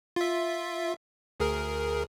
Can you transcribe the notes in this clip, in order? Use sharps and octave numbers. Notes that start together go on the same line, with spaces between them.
F4 E5
D2 G#4 A#4